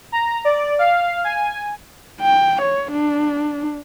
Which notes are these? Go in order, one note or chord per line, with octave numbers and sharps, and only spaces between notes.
A#5
D5
F5
G#5
G5
C#5
D4